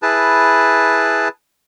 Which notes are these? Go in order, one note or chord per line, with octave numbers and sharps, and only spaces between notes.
E4 G#4 B4 A5